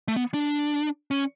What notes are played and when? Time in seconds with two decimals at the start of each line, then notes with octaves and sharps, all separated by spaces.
0.08 A3
0.16 B3
0.34 D4
1.11 C#4